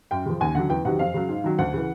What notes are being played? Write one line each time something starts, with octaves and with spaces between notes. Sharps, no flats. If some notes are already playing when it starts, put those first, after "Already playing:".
F#2 G5
C#3 F3
D#2 G#5
D3 F#3 F#5
E2 G5
C3 D#3 F#3 F#5
F2 F5
C#3 F#3
G#2
D#3 F#3
D2 F#5
C#3 E3